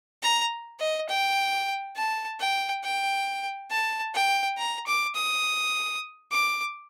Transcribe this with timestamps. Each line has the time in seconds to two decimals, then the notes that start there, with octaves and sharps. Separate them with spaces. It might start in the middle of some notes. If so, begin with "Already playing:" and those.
0.22 A#5
0.79 D#5
1.09 G5
1.96 A5
2.40 G5
2.84 G5
3.71 A5
4.14 G5
4.58 A#5
4.87 D6
5.15 D#6
6.32 D6